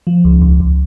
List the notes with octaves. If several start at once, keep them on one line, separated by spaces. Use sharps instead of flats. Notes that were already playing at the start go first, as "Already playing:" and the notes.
F3
C#2
C#2
C#2